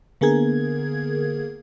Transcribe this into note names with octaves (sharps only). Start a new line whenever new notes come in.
D3 A#3 B3 G#4 A#4 G#6